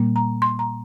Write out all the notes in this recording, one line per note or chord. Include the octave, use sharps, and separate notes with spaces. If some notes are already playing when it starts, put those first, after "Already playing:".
Already playing: A#2 G3 A#3
A#5
C6
A#5